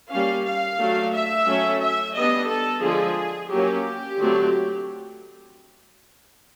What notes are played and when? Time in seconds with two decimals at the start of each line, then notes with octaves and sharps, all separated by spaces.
0.12 G3 A#3 C#4 F5
0.45 F5
0.80 F#3 A3 D4
1.14 E5
1.47 F#3 A3 C#4
1.82 E5
2.15 G3 B3 D4 D#5
2.49 A4
2.83 D3 F3 G#3 G#4
3.51 F#3 A#3 C#4 G4
4.19 D3 F#3 A3 C4